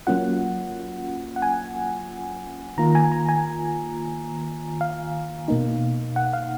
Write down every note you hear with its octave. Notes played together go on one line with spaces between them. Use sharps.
F#3 A#3 C#4 F4 F#5
F#5
G#5
D#3 A#3 F4 A#5
G#5
A#5
G#5
F5
B2 A#3 D#4
F#5
F5